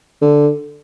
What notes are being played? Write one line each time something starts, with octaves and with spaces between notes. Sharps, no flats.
D3